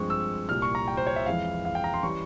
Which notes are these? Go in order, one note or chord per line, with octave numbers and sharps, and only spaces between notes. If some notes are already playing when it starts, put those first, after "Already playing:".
Already playing: G2 F3 G#3 C4 C#6
E6
C2 A#2 G3 F6
C#6
A#5
G5
C5
C#5
E5
F2 E3 G#3 C4 F5
F5
G5
A#5
C6
E3 G3 C#4 C#6